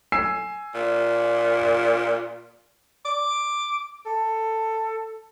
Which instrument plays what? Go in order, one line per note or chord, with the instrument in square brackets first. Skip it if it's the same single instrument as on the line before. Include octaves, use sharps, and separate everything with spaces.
[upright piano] G#5 E6 C7
[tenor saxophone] A#2
[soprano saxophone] D6
A4